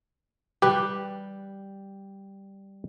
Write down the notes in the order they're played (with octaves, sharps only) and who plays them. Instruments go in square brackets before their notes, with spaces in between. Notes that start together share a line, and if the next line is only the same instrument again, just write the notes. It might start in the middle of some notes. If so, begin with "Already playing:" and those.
[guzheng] G3 [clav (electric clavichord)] G4 B4